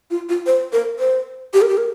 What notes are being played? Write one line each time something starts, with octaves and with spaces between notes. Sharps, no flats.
F4
F4
C5
A#4
C5
G4
A#4
G4
A#4